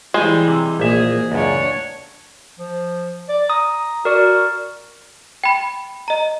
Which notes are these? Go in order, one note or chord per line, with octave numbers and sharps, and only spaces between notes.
E3 G3 G#3 C5 G#5
C3
A#1 A#3 G#4 E5
C#2 F#2 D4 C#5
F3
D5
A#5 D#6
F#4 A#4 D5
G5 B5
D#5 A#5